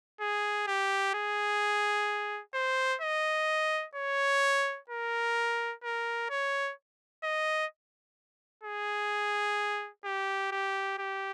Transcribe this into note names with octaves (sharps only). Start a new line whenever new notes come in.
G#4
G4
G#4
C5
D#5
C#5
A#4
A#4
C#5
D#5
G#4
G4
G4
G4